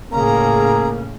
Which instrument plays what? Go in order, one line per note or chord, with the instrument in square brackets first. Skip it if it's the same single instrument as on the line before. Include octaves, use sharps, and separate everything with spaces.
[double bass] A2 C#3 [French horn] A#3 [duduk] G#4 [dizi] A#5